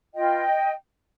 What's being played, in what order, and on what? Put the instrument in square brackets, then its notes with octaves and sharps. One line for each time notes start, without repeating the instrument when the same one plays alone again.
[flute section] F4 B4 D#5 G5